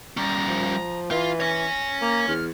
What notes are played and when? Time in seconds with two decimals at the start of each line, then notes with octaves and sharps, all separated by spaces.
0.17 G3 C#4 A#5
0.48 F3
1.11 E3 F4
1.40 C#5 G#5 A#6
2.02 A#3 A#5
2.27 E2 F6